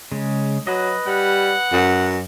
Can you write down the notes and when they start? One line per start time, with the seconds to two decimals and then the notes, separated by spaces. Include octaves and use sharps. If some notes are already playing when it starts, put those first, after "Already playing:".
0.12 C#3 G#3
0.67 F#3 B4 D#5
1.07 G3 F#5
1.73 F#2